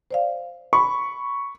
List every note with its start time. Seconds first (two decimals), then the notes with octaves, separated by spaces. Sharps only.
0.11 C5 D5 F5
0.73 B5 C#6